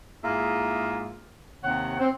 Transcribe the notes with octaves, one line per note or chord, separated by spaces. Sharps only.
G#2 A#3 E4 F4 G#4 E5
D#2 C3 C#5 F#5
C4